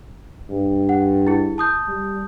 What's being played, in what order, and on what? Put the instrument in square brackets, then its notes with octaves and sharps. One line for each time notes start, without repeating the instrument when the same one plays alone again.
[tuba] G2
[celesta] F#5
E4 G#4
A5 D#6 G6
[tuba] G3